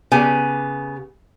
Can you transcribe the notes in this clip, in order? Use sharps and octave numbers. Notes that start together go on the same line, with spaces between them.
C#3 B3 G4 G#5